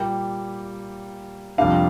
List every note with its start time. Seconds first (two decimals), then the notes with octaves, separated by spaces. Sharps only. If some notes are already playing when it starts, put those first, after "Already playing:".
Already playing: A#2 G3 A#3 G5
1.58 F2 C3 G3 A#3 D4 F5